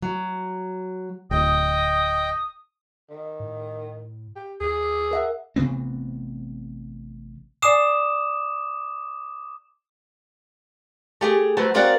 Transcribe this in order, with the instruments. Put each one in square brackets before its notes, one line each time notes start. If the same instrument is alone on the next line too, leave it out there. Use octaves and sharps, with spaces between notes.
[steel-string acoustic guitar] F#3
[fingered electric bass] D1 [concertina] D#5 G5 [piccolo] D#6
[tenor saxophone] D#3
[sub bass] A2
[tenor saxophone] G4
[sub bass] D#2 [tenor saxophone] G#4
[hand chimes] A#4 E5 F#5
[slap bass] A1 C3 B3 C4
[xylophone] D5 G#5 C7 [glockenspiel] D6 D#6 E7
[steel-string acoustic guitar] A3 G4 G#4
F#3 A3 B4 C5
A#3 C4 F#4 A#4 D5 F#5